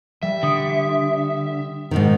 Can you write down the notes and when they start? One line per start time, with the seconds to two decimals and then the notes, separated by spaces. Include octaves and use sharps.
0.23 G3 E5
0.43 D3 D#6 C#7 D7
1.91 G#2 B2 D#3